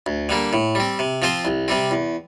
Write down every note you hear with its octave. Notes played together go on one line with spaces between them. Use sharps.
D2
D3 G3 A#3
A2
G3 C4
C3
F3 C4 F4 C5
C2
C3 G3 C4
E2